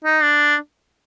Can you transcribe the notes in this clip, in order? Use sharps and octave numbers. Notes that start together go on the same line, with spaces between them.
D#4
D4